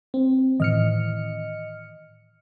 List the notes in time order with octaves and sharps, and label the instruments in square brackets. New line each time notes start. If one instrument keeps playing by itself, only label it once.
[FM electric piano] C4
[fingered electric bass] A2 D#3 E3 [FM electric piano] D#5 F6 C#7